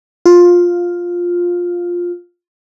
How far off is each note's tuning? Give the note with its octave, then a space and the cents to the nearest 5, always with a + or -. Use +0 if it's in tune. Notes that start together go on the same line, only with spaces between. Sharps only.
F4 +10